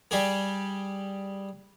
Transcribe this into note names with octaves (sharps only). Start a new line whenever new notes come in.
G3 G4 G#4